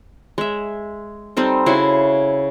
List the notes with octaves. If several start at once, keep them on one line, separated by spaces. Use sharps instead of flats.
G#3 E5
G3 C4 D#4 A4
C#3 E4 F#4 C6